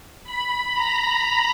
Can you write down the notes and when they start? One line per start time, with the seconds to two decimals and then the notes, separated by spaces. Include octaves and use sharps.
0.24 B5
0.73 A#5